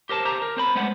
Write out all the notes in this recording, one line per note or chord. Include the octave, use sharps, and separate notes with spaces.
G4 A#4 C5 A5
G4 C5 A#5
A#4
C4 C5 B5
G#3 A3 B3 C#4 C5 F#5